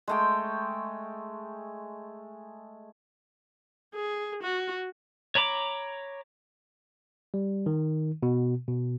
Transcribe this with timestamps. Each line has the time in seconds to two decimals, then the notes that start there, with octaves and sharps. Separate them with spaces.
0.08 G#3 A3 G5
3.95 G#4
4.43 F#4
5.35 C#5 A#5 B5 D6
7.34 G3
7.66 D#3
8.23 B2
8.68 B2